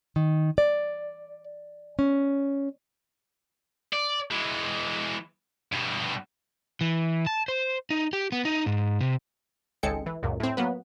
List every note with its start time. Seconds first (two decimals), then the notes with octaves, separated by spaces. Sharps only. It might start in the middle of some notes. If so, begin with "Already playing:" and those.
0.16 D#3
0.58 D5
1.99 C#4
3.93 D5
4.31 E3 G#3
5.72 G2 B2
6.81 E3
7.27 A5
7.48 C5
7.90 D#4
8.13 G4
8.32 B3
8.45 D#4
8.66 G#2
9.01 C3
9.83 G#1 C#2 G#3 A4 G5 C#7
10.06 E3
10.23 C#2 F#2 A#2
10.40 A2 C4
10.57 F#3 A#3 B3 B4